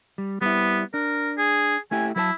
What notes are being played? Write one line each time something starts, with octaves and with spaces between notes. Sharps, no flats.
G3
G3 B3 E4
D4 A#4
G#4
A3 E4 G4 G#5
F#3 E4 A#4 A5